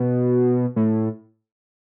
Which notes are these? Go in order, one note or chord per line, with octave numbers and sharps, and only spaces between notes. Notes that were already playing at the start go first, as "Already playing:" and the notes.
Already playing: B2
A2